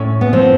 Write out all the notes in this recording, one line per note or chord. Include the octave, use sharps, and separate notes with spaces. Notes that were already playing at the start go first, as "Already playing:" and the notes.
Already playing: A2 C#4
B3
F3 C4